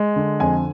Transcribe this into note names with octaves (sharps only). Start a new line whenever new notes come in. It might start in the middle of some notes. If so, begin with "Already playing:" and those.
Already playing: G#3
D3
F2 G#5